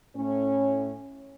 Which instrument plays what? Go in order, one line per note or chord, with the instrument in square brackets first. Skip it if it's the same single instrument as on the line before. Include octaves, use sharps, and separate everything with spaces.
[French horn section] A2 C#4